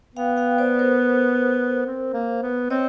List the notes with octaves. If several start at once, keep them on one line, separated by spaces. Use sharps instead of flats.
B3 F5 G5
F5 G5
C5 D5
A#4 C5
C4
A#3
B3
C4 C#5 D#5